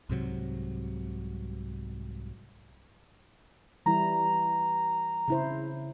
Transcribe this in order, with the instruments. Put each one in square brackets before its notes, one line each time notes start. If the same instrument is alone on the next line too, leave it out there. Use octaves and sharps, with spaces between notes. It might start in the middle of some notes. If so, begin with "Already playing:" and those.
[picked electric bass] C2 G#2 C3 F#3
[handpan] E3 G3 E4 [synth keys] A#5
[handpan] C#3 E4 C5